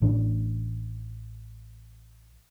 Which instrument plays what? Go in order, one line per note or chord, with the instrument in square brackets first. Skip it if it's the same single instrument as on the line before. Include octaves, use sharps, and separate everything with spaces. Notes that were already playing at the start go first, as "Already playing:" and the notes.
[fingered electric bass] A1 A2 E3 D4